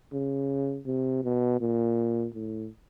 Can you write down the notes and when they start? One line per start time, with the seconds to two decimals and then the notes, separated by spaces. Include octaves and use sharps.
0.13 C#3
0.86 C3
1.23 B2
1.60 A#2
2.34 A2